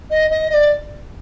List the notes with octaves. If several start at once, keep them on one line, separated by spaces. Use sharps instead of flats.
D#5
D#5
D#5
D5